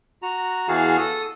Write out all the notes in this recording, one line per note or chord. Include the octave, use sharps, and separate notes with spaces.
F#4 A#5
E2 E3 F#4 G#4 F5 A5
A4 D#6